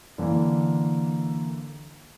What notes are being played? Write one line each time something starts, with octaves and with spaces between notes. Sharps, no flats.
D3 E3 A#3